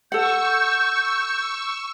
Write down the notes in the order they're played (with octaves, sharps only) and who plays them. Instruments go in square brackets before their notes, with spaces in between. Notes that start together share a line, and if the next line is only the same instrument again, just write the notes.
[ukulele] A4 F#5 [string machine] C#6 E6 [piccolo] G6